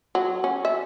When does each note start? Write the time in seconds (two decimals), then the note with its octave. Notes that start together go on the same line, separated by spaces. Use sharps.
0.15 F#3
0.44 C#4
0.65 E5